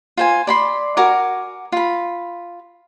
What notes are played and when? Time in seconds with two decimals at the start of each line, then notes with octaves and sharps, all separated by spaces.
0.17 F4 C5 G#5
0.47 D5 B5 C6
0.97 F#4 A#4 G#5 D6
1.72 F4 B5